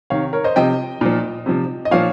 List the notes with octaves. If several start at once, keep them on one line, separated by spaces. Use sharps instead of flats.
C3 D#3 C#5 F5
A#4 C#5
C5 D#5
C3 F3 D#5 G5
A#2 F3
C3 F3
D#5
A#2 F3 C#5 F5